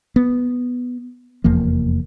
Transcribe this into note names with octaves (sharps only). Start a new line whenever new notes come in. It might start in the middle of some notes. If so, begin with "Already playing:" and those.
B3
F1 E2 F3 A#3